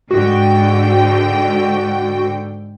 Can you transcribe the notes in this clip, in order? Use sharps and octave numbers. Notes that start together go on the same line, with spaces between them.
G#2 D3 F#4 G5